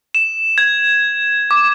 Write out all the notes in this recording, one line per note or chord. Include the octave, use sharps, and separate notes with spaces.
E7
G#6
D6